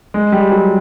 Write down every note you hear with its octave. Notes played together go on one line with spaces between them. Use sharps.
G#3
G3
F#3